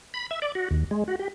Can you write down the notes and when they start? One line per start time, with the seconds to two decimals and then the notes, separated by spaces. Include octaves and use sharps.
0.14 B5
0.31 E5
0.42 D5
0.55 F#4
0.71 D#2
0.91 G#3
1.08 F#4
1.19 G4